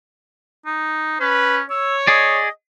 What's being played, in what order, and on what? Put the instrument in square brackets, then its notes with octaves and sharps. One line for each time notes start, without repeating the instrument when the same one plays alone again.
[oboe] D#4
[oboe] C#4 [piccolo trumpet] B4
[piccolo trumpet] C#5 [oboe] E6
[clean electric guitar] G#4 D5 [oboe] D#5